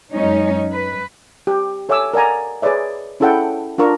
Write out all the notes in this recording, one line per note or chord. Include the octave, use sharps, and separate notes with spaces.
F#2 G#3 C#4 D#4 C#5
B4
G4
A4 C#5 E5 G#5 D6 E6
A#4 D5 F#5 G#5 A#5
G#4 B4 C#5 D5 E5
C#4 E4 G#4 A4 F#5 G5
D4 F4 A#4 C#6